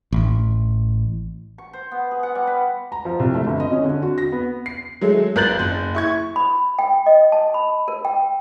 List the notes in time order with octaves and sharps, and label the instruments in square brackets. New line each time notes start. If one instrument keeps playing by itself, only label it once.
[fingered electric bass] A1
[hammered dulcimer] C#6
C5
B3
G#4
F#5
G3
B4
[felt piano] A#5
F3
C2
A3
G1
D#5
C#4
D3
F#4
A#6
B3
[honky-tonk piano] C7
F#3 G#3 A3
G#1 A#4 F#6 G6 A6 F#7
F#1
E4 C#6 G#6
[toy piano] B5
G5
D#5
A5
B5
A#4
G5